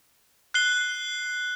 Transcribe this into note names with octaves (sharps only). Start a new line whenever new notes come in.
F#6 C7 G7